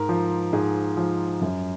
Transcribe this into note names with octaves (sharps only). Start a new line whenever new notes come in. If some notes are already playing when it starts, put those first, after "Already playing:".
Already playing: G#2 A#4
F3
G#2 G#4
F3
F#2